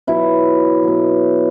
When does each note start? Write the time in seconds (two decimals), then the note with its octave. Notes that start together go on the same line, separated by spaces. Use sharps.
0.07 B2 F#3 E4
0.83 B2 F#3